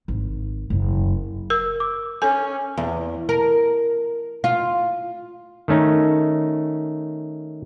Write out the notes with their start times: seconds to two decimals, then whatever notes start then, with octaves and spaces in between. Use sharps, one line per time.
0.08 G#1
0.70 F#1 F#2
1.50 A#4 E6
1.80 D6
2.22 C#4 A4 G#5
2.77 E2
3.29 A#4
4.44 F4
5.68 D#3 A3 C#4 D#4